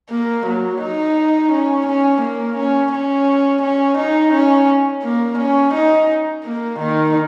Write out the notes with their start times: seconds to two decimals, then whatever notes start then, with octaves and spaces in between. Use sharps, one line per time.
0.10 A#3
0.46 F#3
0.81 D#4
1.52 C#4
1.87 C#4
2.21 A#3
2.56 C#4
2.92 C#4
3.62 C#4
3.97 D#4
4.33 C#4
5.03 A#3
5.38 C#4
5.74 D#4
6.44 A#3
6.79 D#3